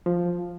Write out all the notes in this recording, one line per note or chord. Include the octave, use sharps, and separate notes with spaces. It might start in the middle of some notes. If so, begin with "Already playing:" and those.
F3